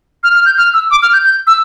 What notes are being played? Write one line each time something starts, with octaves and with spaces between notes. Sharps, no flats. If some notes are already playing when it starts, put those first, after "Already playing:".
F6
F6
G6
F6
E6
D6
F6
G6
G6
E6